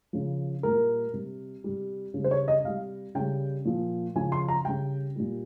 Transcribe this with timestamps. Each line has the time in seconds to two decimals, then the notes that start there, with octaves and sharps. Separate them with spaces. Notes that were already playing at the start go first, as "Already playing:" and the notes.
0.13 C#3 F3
0.63 A#2 G3 A#4
1.13 C3 G3
1.64 C3 G3
2.14 C#3 G3
2.24 C5
2.31 C#5
2.48 D#5
2.64 C3 G3 F5
3.15 C#3 G3 G5
3.65 A#2 F3
4.15 C#3 F3 G#5
4.32 C6
4.48 A#5
4.65 C#3 G3 G5
5.16 A#2 G3